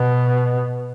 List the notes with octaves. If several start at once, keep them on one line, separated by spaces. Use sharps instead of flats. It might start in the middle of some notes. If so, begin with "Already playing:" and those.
Already playing: B2